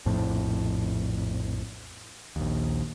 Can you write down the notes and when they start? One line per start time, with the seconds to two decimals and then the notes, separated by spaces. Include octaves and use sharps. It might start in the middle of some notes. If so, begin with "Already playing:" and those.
0.05 A#1 F2 A2 F3
2.36 A#1 D#2